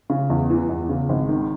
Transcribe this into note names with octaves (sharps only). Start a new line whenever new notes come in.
C#3
E2
E3
E2
C#3
G#1
D#3